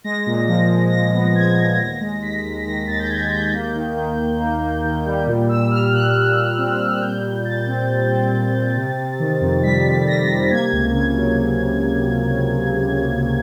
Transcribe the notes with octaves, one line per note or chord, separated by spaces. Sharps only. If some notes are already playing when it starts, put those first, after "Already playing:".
G#3 A#6
A#2
F3 A#6
G#3
A#2 A#6
B3
G#3 G#6
A#2
D#2 A#6
G#3
D#2 B6
D#2
D#3 A#6
D#2 A6
G6
G#3 G#6
D#2 G6
A#3
D#3
D#3
D#3
A#3
A#3
D#3
G3
A#2
A#2 E6
G3 F6
A#2 F#6
A#2
A#2
C4
A#2
G3 G6
A#2
A#2 A6
C4
A#2
C4
A#2
C4
C3
C3
D#3
F2
G3 B6
F2
G3 A#6
C3
A#3 G#6
C#2
C#3 G#6
F#3